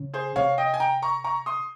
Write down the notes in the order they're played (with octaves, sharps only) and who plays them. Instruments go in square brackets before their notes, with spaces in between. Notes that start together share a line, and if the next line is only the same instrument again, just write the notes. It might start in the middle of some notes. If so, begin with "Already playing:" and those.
Already playing: [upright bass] C#3
[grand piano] G#4 C5
[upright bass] C3 [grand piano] C#5 F5
[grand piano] D#5 G5
G#5
G5 A#5
A#5 C#6
A#5 C#6
C6 D#6